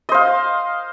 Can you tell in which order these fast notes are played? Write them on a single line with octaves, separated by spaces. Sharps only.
D#5 C5 F5